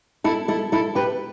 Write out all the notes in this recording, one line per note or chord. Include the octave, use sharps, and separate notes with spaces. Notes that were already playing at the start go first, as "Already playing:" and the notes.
E4 A4
E4 A4
E4 A4
G4 B4